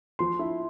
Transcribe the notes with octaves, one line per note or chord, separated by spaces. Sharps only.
F3 C6
E4